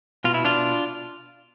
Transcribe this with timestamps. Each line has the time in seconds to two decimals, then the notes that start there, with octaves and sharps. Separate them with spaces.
0.24 B2 F4
0.34 E4
0.45 D4 F4